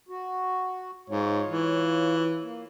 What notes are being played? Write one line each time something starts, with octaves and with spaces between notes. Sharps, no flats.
F#4
G#2 F4 C#5
E3
A#3